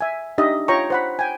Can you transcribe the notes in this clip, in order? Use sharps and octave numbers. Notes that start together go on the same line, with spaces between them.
E5 G#5
D4 D#4 G4 D#5 E5
F4 C#5 G5 A#5 C#6
C5 F#5 B5
G5 G#5